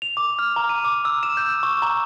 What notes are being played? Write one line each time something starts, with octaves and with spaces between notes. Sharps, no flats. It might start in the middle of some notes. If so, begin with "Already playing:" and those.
F7
D6
F6
A#5
D#7
D6
E6
E7
G6
C#6
A#5